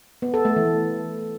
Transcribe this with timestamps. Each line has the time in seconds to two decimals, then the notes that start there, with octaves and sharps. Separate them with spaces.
0.22 B3
0.34 A4
0.45 A3
0.56 E3